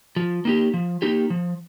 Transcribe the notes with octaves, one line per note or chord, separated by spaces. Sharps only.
F3
A#3 D#4 G4
F3
A#3 D#4 G4
F3